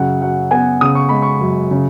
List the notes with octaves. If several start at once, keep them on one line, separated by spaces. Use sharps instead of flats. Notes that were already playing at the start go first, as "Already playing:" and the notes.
Already playing: F#2 C#3 F#5
F#3 F#5
B3 G#5
C#3 D#6
C#6
G#3 B5
C#6
F#2
C#3